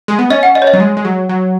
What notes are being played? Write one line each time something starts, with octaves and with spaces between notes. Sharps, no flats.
G#3
B3
C#4 D#5
F#5
D#5
C#5
D#5
F#3
G#3
G#3
F#3
F#3